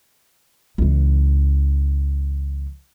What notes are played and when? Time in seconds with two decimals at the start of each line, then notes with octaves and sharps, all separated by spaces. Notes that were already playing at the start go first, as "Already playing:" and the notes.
0.78 C#2 E3